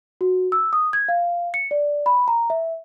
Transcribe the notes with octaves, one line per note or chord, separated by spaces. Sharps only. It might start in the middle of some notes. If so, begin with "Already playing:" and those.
F#4
E6
D#6
G#6
F5
C#7
D5
B5
A#5
E5